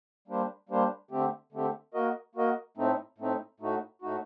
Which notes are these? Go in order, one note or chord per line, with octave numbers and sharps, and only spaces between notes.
G3 A#3 D4 G4 C5
G3 A#3 D4 G4 C5
D3 A3 C4 G4
D3 A3 C4 G4
A#3 F#4 A#4 D#5
A#3 F#4 A#4 D#5
A2 A3 C4 D#4
A2 A3 C4 D#4
A2 A3 D#4 F#4
A2 A3 D#4 F#4